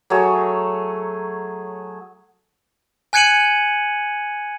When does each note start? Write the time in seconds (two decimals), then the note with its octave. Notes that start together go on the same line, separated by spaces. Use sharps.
0.10 F#3 A3 G#4 C#5
3.13 G#5 F#6 G#6 C#7 D#7 F#7